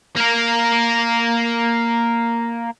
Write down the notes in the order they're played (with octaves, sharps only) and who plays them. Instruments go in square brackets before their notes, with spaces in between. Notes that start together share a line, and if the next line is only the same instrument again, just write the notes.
[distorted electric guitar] A#3 A#4